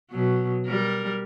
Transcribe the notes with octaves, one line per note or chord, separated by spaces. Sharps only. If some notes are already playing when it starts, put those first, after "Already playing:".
B2 F#3
G3 A#4